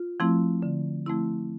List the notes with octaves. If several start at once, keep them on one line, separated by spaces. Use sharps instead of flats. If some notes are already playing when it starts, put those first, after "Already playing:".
Already playing: F4
F3 A3 C4 E4
D3
F3 A3 C4 E4